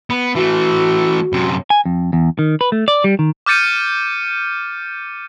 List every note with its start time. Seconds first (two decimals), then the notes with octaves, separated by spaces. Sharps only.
0.10 B3
0.35 E3 A3 F#4
1.33 F#2 C3
1.70 G#5
1.86 F2
2.13 E2
2.39 D#3
2.61 B4
2.72 A3
2.88 D5
3.04 G3
3.19 D#3
3.46 D6 F6 G6 A6 C#7 D#7